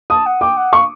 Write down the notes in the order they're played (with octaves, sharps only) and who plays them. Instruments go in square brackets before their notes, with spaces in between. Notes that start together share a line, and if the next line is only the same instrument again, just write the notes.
[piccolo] A5 [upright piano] D#6
[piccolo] F#5
[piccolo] G5 [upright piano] D6
[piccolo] F#5
[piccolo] F5 [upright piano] C#6